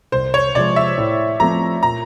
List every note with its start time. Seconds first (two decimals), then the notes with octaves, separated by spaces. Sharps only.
0.12 C2 C5
0.34 C#5
0.55 C3 F3 G#3 D5
0.76 E5
0.98 A2
1.40 F3 A3 C4 A#5
1.83 A#2 A#5